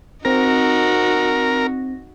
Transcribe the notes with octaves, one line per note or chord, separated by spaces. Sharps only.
C4 D#4 F#4 A#4 A#6